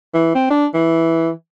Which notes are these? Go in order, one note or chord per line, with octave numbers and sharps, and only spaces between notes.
E3
C4
D4
E3